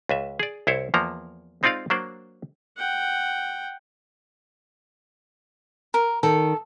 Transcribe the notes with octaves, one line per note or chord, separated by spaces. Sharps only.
C#2 B4 E5
G#4 D5
C2 E4 C5 C#5
E2 F3 A#3 A#5
G#3 C4 D#4 F4 D5 F5
F#3 A#3 D4 C5 D5
F#5 G5
A#4
D#3 A4